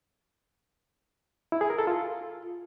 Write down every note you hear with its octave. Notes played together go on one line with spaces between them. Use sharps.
E4
G#4
A#4
A4
F4